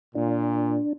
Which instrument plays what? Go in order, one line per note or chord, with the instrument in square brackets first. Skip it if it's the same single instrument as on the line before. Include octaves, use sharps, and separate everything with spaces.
[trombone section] A#2 [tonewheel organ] D4